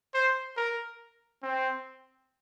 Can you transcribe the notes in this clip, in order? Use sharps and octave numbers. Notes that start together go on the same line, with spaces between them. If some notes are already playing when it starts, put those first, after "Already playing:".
C5
A#4
C4